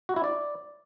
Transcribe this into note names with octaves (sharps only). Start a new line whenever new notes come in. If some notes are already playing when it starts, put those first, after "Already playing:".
F#4
E4
D5